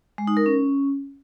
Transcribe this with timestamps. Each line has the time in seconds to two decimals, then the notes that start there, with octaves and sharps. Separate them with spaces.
0.18 G#3
0.27 D#4
0.37 A#4
0.46 C#4